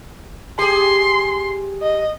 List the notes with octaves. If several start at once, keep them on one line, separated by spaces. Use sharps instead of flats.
G4 G#4 C6
D#5